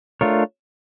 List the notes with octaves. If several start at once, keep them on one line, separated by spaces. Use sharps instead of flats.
A3 D4 F4 A#4 C#5